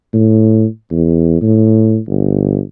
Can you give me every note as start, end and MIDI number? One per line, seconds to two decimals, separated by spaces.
0.14 0.66 45
0.91 1.40 40
1.42 1.98 45
2.08 2.61 31